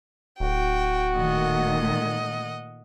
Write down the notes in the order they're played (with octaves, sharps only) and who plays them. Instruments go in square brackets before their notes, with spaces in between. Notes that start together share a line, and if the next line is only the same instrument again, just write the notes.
[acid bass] D1 [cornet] F#4 [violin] G5
[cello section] A#2 D#3 A3 [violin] D#5 F#5